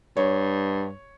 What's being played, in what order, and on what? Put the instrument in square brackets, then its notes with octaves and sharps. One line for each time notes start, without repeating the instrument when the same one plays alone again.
[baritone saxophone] G2 [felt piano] C#5